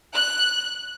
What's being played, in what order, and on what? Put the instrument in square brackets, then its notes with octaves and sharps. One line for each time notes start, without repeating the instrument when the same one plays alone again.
[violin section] F#6